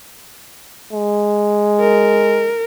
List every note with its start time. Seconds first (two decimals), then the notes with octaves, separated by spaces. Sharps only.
0.93 G#3
1.80 A#4